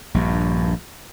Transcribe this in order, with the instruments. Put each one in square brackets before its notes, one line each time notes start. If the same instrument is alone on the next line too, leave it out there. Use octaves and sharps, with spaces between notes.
[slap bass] A#1 G2